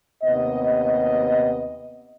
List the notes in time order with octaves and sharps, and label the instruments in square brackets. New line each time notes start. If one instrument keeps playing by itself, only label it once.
[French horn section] D#2 C3 B3 D#5